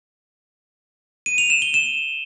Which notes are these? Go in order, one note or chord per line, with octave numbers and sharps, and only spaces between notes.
D#7
F7
E7
G7
E7